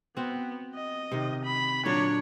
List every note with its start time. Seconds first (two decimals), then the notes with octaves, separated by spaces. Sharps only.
0.17 B3 C4 F#4
0.75 D#5
1.12 C3 D#3
1.44 B5
1.85 A#2 D3 F#3 D4 C#5